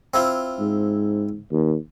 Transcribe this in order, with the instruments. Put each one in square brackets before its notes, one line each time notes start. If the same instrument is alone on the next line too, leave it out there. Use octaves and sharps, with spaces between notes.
[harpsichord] C4 E4 F4
[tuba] G#2
D#2